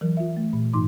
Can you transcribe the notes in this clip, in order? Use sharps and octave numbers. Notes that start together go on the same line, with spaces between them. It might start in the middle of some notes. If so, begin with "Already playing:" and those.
E3 F#3 A#4
F4 E5
A3
A#2
G#2 E3 D#4 C6 D6